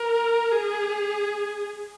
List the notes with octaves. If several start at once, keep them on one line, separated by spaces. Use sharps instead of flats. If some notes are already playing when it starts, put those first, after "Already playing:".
Already playing: A#4
G#4